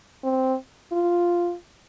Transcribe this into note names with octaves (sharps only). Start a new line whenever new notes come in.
C4
F4